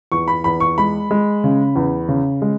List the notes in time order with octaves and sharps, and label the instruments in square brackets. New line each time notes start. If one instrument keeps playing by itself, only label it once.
[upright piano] E2 C#6
B5
E2 B5
C#6
G#3 B5
G#3
C#3
E2
C#3
G#3